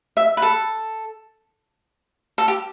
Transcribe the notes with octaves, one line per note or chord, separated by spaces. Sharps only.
E5
B4
A4
A4
G4